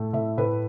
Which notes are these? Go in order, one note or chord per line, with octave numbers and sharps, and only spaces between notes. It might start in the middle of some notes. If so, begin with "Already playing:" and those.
Already playing: A2 A3
A2 E5
A2 B4